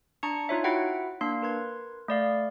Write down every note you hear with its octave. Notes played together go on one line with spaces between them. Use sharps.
D4 A5 A#5 C#6 C#7
D#4 F4 C#5 E5
E4 F#4 E5 F#5 G5
A#3 D4 F5 C6
A#4 B4 C6 G#6
A3 D5 F5